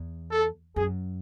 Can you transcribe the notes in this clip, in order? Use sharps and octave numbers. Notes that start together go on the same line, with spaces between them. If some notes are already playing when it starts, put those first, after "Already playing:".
Already playing: E2
A4
F#2 G#4